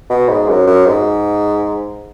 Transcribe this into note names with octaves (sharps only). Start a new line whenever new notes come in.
B2
G#2
F#2
F#2
G#2